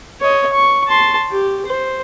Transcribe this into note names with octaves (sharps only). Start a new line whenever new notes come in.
C#5 D#5
C#6
A5 C6
G4
C5